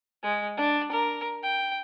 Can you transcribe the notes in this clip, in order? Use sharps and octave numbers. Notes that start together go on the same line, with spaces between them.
G#3
D4
A#4
G5